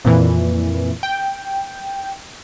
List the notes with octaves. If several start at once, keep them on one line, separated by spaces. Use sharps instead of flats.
F2 A#2 E3
G5